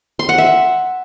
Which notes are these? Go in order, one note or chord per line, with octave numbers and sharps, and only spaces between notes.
C6
F#5
E5